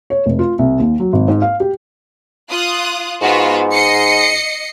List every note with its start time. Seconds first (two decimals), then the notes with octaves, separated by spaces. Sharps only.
0.10 C#5
0.26 F1
0.39 F4
0.59 C2
0.79 D#2
1.00 F#3
1.13 G#1
1.28 G#2
1.42 F5
1.60 G4
2.50 F4 D#6 F#6
3.21 G#2 B3 F4 F#4
3.72 D#5 C7 C#7